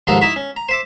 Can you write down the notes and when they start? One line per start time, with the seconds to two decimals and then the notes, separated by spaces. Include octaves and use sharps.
0.07 D#2 G#2 F3 D#4 A4 A#5
0.21 D#4 E4 E5 A#5 B5 C#6
0.36 C#4
0.56 A#5
0.69 C5 E5 D6